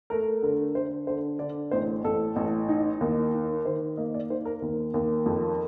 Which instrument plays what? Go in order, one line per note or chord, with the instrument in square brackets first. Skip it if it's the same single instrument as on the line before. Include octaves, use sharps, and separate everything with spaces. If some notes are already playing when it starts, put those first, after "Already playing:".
[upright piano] A3 A#4
D3 A#4
D3 C5
D3 C5
D3 D5
A1 C5
A1 A4
A1
D#4
D#2
D#4
D#3 C5
A#3 D#5
D5
D#4 C5
A#4
D#2
D#2
F2